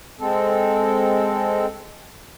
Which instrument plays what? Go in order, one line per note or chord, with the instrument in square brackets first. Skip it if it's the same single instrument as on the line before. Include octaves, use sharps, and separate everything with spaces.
[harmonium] G#3 C4 A4